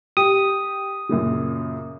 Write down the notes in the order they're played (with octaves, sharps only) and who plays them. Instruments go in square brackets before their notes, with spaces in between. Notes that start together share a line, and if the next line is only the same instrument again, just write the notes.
[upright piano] G4 [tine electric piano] D#6
[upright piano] F#2 A#2 C#3